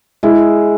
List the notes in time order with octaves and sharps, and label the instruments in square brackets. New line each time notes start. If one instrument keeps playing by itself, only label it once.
[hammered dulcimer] G#3 [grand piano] E4